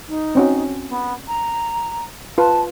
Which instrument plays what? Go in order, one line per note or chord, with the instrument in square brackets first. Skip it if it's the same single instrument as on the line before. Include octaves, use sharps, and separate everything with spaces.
[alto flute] D#4
[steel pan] C4 C#4 F#4
[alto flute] B3
A#5
[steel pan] F4 B4 [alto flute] A5